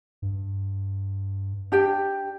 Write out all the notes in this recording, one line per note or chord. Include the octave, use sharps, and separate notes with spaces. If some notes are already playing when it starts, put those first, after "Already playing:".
G2
D4 G4 G5